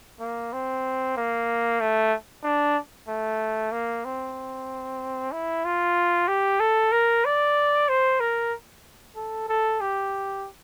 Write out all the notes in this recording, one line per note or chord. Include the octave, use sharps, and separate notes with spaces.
A#3
C4
A#3
A3
D4
A3
A#3
C4
E4
F4
G4
A4
A#4
D5
C5
A#4
A4
A4
G4